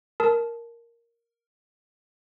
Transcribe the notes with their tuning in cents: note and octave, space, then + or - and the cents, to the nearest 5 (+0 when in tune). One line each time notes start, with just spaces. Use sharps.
A#4 +0 A5 -15 D#6 +30